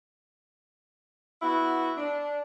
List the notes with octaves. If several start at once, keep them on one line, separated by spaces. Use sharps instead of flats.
B3 E4 F#4
D4